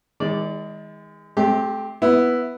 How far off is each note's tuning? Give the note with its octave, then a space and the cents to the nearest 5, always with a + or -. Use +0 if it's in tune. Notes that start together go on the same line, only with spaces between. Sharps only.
D#3 +35 G#3 -25 D5 +0
A3 -40 C4 +0 G4 +0
B3 +0 E4 +0